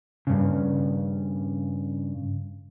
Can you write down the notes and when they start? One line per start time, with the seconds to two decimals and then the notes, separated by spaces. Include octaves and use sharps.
0.27 G2 C#3